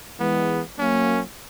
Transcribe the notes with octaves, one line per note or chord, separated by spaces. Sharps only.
E3 G#3 B3
F#3 A#3 C#4